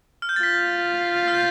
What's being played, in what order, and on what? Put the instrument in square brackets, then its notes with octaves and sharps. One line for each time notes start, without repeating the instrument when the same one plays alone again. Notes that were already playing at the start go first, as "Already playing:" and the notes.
[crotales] F6
G6
A6
[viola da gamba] F4 [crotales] B6
[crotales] F6
G6